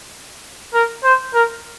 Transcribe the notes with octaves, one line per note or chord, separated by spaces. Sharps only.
A#4
C5
A#4